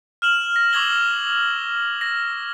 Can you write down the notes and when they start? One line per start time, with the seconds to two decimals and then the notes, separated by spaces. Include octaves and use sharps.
0.22 F6 E7 F#7
0.56 A#6
0.73 C#6 D6 E6 G#6 F#7 G7
2.01 A#6